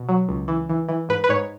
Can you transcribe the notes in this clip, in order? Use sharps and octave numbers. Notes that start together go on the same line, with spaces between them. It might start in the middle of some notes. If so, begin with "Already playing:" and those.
Already playing: B2
F#3
C#2
E3
E3
E3
G#2 B4
B4
G#2 C#5